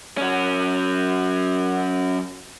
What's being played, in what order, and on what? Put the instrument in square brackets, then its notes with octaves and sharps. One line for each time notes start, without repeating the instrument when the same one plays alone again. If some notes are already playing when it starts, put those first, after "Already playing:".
[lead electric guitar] F#3 C#4